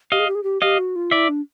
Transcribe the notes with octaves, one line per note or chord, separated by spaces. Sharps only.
G4 D#5 F5
G#4
G4
G#4
G4
G4 D#5 F5
F#4
F4
E4 D5 E5
D4